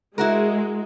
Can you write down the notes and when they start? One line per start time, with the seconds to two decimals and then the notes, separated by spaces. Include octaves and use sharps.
0.18 G#3 E4 F#4 A#4